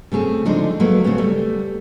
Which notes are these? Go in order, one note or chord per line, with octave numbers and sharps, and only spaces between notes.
C#3 A3 C4 G#4
D3 F3 G#3 D4 D#4
F#3 A3 A#3 B4
C#3 A3 B3 C4
G3 A3